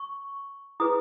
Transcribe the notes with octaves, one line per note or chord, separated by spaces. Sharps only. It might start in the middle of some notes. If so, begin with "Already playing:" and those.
Already playing: C#6
E4 G#4 B4 D#6